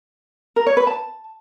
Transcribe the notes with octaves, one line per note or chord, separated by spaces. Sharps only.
A#4
C#5
B4
A5